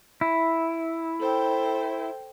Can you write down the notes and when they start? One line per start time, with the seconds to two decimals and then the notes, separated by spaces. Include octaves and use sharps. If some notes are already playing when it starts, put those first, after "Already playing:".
0.21 E4
1.20 A4 C5 G5